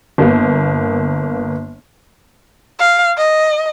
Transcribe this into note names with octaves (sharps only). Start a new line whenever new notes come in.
G1 A#3 B3
F5
D#5